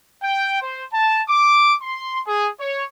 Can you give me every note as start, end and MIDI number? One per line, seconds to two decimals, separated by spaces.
0.23 0.59 79
0.61 0.85 72
0.93 1.22 81
1.28 1.75 86
1.82 2.20 84
2.27 2.48 68
2.60 2.85 73